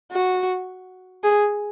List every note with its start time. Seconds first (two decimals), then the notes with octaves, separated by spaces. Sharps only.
0.12 F#4
1.24 G#4